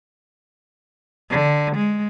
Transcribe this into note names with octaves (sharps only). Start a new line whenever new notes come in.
D3
G#3